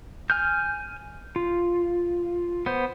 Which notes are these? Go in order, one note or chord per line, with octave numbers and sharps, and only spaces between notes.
G#5 F6 G6
F4
B3 C5